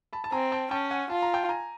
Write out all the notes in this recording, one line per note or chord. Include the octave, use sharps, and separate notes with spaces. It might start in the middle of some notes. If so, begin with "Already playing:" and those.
A5 B5
A5
C4 G#5 A#5
G5 A5
C#4 G5 A5
F#5 G#5
F4 A5
A#5
G5 A5
G#5 A#5